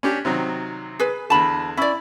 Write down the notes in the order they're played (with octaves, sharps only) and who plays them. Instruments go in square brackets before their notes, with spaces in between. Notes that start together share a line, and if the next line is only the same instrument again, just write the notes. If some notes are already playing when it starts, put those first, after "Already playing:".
[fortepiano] C#4 D4 G4
C3 D#3 F#3
[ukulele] G#4 B4
[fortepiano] E2 D3 [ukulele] A5 B5
[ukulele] C#4 D5 [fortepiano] E4 B5 E6